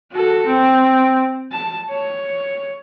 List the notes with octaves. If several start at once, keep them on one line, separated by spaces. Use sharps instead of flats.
F#4 A4
C4
A5
C#5